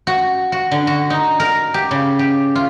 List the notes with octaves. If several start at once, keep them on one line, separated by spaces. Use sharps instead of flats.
F#4
F#4
D3
F#4
D#4
A#4
G4
C#3
G4
F4